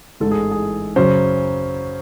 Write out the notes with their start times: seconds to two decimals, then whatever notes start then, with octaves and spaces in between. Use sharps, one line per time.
0.20 A1 G#2 E3 G#3 A4
0.31 G#4
0.51 G#4
0.96 F#2 C#3 F#3 C#4 C5